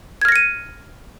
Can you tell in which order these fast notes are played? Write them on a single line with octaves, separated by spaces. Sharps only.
G#6 F6 A#6 C#7 D#7